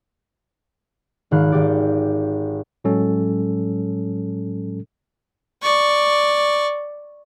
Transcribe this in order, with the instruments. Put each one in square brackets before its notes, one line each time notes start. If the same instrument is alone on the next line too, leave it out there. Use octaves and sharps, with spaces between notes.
[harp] G#1 D#3 F5 F#6
G#1 G4 D5
[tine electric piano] A2 F#3 G#3 C#4 A4
[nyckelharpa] D5 C#6